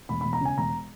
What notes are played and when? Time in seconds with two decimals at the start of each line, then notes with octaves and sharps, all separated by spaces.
0.09 E1 B5
0.21 B5
0.25 E1
0.33 A#5
0.41 C#3 G#5
0.57 E1 A#5